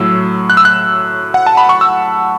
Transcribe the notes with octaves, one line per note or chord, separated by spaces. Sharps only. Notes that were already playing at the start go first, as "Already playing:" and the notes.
Already playing: A2 F#3 E6
F#6
E6
F#6
F#5
A5
B5
C#6
E6